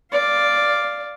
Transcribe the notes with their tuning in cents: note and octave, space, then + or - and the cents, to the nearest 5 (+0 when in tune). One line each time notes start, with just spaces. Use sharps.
D5 +0 F5 +0